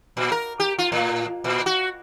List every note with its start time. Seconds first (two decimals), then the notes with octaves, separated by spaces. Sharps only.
0.17 A#2
0.32 A#4
0.60 G4
0.79 F4
0.92 A2
1.44 A#2
1.66 F#4